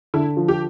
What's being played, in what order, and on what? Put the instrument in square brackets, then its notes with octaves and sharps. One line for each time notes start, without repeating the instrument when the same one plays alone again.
[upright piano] D3 [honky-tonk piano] E4
[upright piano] F3
[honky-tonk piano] G4